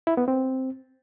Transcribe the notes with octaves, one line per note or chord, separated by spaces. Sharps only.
E4
B3
C4